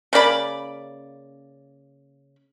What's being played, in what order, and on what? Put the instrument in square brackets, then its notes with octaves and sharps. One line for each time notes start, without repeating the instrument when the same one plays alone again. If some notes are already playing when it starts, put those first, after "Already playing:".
[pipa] C#3 A#3 D5 B5